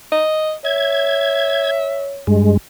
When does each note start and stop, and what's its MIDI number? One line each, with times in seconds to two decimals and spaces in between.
0.12 0.54 75
0.65 2.27 73
0.65 2.13 76
0.65 1.71 92
2.27 2.57 43
2.27 2.57 56